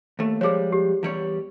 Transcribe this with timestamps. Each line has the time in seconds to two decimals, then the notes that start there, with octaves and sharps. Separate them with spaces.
0.19 D#2 A3
0.41 F3 G3 G#3 G#4 C#5
0.72 G4
1.03 E2 G3 C#5